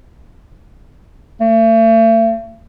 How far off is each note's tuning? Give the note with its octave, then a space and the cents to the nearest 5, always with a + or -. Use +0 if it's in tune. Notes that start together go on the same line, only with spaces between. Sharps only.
A3 +40